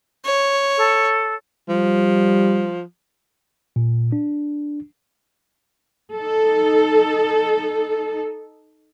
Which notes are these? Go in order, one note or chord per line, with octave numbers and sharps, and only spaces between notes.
C#5
A4
F3 G3
A#2
D4
D#4 A4